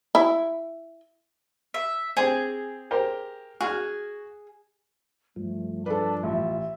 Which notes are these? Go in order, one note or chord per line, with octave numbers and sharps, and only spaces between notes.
E4
E5
C4 G4 G#4 C5
G4 A#4 C5
F#4 G#4 F6
G2 F3 A3
D4 A4 B4 A5
A1 F4 E5